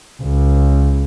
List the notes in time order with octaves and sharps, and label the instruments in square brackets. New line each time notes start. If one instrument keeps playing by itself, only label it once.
[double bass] C#2